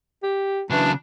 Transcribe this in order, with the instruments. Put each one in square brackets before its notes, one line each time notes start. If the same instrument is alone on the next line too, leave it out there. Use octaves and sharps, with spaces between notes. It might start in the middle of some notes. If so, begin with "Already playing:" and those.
[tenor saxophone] G4
[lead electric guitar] C#3 F#3 [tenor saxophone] E3 [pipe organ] D4